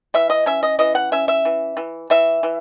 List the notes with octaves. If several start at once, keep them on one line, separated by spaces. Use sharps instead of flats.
E3 E5
D#5
C#4 E5
D#5
E3 D#5
F#5
C#4 E5
E5
E3
E3
E3 E5
E3